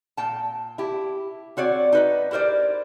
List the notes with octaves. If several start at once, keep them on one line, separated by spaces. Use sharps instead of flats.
A#2 G5 A5
E4 G4
C4 F#4 C#5 D5
D#4 B4 D#5
E4 G4 A#4 C5 D5